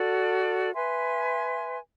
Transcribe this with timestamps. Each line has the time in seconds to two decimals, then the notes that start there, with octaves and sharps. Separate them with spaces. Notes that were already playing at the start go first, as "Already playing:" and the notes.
Already playing: F#4 A4 D5
0.73 B4 E5 G#5 C6